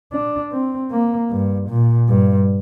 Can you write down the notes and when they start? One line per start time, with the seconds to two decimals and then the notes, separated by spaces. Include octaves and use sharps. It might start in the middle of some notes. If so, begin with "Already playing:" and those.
0.13 D4
0.52 C4
0.91 A#3
1.30 G2
1.69 A#2
2.09 G2